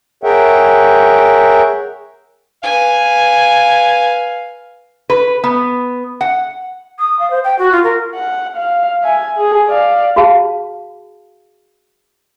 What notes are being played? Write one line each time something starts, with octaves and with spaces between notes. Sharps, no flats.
G#4 A#4 C#5 E5 F#5 G5
B4 F5 G#5
B4
B3
F#5
D#6
F5
C5
G5
F#4
F4
A#4
F#5
F5
E5 G#5
G#4
D5 F5
F#4 G#4 F5 A5